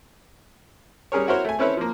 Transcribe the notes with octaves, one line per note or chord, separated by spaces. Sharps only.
G3 C#4 G#4 A#4 C#5
E4 F#4 A#4 C5 C#5
A3 G#5
C4 C#4 E4 A4 B4 C#5
F3 A#3